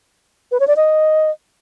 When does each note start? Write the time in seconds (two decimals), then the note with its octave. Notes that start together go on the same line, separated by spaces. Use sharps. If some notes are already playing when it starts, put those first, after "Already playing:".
0.52 B4
0.60 C#5
0.68 D5
0.77 D#5